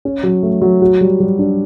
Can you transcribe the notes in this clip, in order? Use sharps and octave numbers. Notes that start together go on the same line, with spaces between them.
C#4
F#3
A3
F#3
F#4
G3
G3
D4